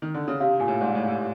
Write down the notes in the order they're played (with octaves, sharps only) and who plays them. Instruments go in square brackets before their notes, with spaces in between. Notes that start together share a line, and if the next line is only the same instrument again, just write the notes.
[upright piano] D#3
D3
C#3
[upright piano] C3 [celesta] F5
[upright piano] A#2 [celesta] G#5
[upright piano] A2
[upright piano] G#2 [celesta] D5
[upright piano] A2
[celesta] F5
[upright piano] A2